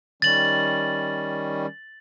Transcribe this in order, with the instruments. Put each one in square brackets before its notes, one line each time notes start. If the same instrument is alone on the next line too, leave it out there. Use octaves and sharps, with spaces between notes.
[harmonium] D#3 G3 C#4 [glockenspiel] A6 F#7